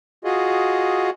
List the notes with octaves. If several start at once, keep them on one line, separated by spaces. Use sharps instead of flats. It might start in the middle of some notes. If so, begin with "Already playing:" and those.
F4 F#4 G#4 D#5